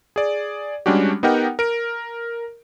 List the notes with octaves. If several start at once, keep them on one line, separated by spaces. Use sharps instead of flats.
G#4 D5
G3 G#3 C#4 D4 F#4 G4
B3 D#4 G4 A#4 F#5 G5
A#4 D7